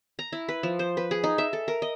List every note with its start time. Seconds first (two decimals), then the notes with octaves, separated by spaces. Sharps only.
0.19 A#5
0.32 E4
0.49 B4
0.63 F3
0.79 C5
0.97 B4
1.11 G#4
1.24 D#4
1.38 E5
1.53 A4
1.68 A#4
1.82 D#5